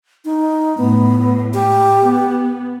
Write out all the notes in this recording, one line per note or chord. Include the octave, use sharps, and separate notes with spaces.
D#4
A2 B3
G4
B3